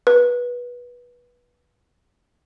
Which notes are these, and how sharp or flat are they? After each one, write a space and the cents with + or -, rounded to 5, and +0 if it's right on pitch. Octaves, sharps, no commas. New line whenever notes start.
B4 -20